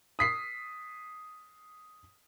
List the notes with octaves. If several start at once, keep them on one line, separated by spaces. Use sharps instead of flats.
D#6 B6 C7